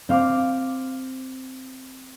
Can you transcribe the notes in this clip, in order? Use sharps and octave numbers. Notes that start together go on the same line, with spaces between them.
C4 F5 D6